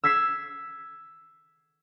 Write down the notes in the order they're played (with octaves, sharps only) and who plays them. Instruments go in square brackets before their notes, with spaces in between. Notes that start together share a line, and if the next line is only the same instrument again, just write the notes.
[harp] E6 G#6 B6 C7 E7